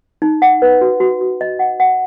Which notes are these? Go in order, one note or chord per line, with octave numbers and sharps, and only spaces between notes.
D#4
F#5
B4
F#4
F#4
F#4
D#5
F#5
F#5